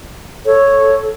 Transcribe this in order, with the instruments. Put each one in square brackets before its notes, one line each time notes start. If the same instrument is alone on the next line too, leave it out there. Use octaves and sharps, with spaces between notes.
[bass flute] A4 [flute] C#5